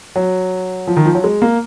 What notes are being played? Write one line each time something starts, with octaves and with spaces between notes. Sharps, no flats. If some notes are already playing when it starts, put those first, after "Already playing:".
F#3
F3
D#3
F3
F#3
G#3
A#3